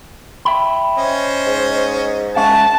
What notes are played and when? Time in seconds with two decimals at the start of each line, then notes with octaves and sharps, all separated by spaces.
0.45 E5 G5 B5
0.98 C#4 C5 D#5
1.47 G#2
2.36 G#3 C#4 E5 F#5 A5